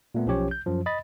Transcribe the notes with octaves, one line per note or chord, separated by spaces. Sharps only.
A#2 A3 B3
B1 F3 C#4 G4 C#5
G6
F#2 F3
D#5 B5 A6